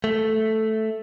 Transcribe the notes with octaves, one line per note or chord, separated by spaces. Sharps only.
A3